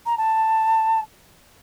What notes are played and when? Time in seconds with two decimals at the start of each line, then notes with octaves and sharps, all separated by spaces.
0.06 A#5
0.17 A5